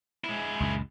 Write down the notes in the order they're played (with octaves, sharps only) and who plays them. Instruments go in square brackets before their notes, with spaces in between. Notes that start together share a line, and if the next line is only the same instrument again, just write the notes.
[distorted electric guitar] G#3 E4
[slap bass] C#2 F#2 A#2